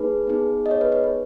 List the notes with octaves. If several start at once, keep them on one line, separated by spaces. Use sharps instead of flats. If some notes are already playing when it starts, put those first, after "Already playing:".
Already playing: A#3 D#4 G#4 B4
B3 D#4 G#4
D#5
C#5
B4
B4
B4